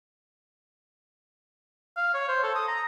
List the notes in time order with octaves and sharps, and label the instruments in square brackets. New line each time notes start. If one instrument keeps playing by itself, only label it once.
[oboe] F5
C#5
C5
A4
D#6
A#5